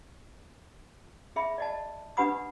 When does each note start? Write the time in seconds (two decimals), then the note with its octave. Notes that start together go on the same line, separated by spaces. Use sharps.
1.36 G#4 E5 B5
1.58 D5 D#5 A5
2.17 D4 G4 B4 F#5 B5 D#6